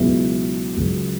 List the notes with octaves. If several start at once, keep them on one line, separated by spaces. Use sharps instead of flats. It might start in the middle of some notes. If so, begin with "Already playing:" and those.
Already playing: C#2 B2 F#3 B3 E4
C#2 C#3 F#3